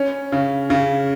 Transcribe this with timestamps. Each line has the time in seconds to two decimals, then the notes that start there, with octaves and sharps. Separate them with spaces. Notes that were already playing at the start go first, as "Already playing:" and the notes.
Already playing: C#4
0.32 C#3
0.70 C#3